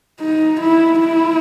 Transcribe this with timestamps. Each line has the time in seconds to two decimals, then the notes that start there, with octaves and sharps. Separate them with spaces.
0.20 D#4
0.60 E4
1.00 E4